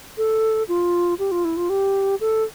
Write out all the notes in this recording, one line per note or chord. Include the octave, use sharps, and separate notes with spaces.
A4
F4
G4
F4
E4
F4
G4
A4